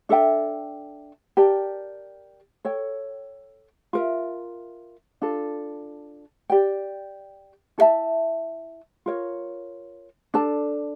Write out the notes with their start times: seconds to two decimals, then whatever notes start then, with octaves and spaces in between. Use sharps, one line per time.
0.09 D4 A4 E5 G5
1.37 G4 A#4 D5 A5
2.65 A4 C#5 G5
3.93 F4 A#4 E5
5.22 D4 F4 A4
6.50 G4 D5 G5
7.78 E4 A4 E5 A5
9.06 F4 A#4 C#5
10.34 D4 A4 D5 A5